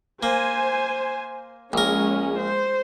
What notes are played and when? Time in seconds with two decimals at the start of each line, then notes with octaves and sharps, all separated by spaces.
0.23 A#3 C5 G#5
1.73 A#1 G#3 C#4 A#4
2.39 C5